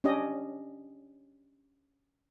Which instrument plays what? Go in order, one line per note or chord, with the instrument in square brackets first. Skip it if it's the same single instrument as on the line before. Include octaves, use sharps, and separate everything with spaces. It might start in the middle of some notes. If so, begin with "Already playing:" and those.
[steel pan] C#4 D4 G4 D#5